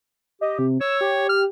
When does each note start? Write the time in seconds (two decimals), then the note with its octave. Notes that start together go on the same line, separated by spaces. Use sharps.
0.41 G4 D#5
0.59 C3
0.81 C#5 E6
1.01 G4
1.29 F6